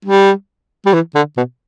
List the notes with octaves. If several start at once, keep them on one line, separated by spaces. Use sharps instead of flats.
G3
G3
E3
D3
B2